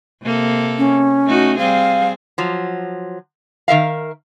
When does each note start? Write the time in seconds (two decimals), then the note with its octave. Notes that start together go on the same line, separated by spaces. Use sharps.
0.23 C3 A#3 A4
0.78 C#4
1.26 A3 D#4 F#4
1.58 G3 C4 G#4 F5
2.38 F3 F#3
3.68 D#3 A#4 E5 F5